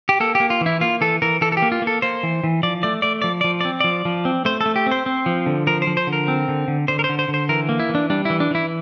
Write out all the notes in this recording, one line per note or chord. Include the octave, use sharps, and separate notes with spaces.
G4
A#3 A4
A#3 G4
F4
E3 E4
A#3 F4
E3 A4
E3 A#4
E3 A4
A4
G4
A#3
F4
A#3
A4
A#3 C5
E3
E3
F3 D5
A3 D5
A3 D5
F3 D5
F3 D5
C4 D5
F3 D5
F3
C4
A3 C5
A3 A4
G4
C4 C5
C4
F3
D3
F3 A#4
C5
F3
C5
D3
A#4
C4
D3
D3
D3 C5
A#4
C5
D3
C5
D3
C5
E3 A#4
A#3
E4
E3
D4
G3 D4
E3 E4
D4
E3 E4